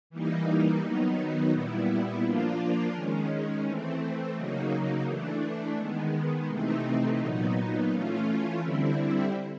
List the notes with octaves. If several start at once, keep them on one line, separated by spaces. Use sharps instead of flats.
E3 G3 A#3 D#4
D#3 F#3 B3 D#4
A#2 G3 B3 E4
F3 A#3 D4 F4
D#3 G#3 C#4
E3 A3 C4
C#3 F#3 A#3 D#4
E3 A3 D4
D#3 G#3 B3
C3 E3 A3 C4 D#4
A#2 F#3 B3 D#4
E3 A3 C#4 F4
D3 G3 C4 E4